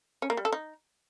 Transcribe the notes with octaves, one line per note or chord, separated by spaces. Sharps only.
C#4
A#3
G3
A4
D#4